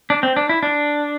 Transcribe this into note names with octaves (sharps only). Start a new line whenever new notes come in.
D4
C4
D4
E4
D4